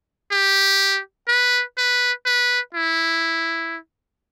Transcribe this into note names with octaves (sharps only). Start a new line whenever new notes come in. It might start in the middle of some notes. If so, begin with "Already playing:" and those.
G4
B4
B4
B4
E4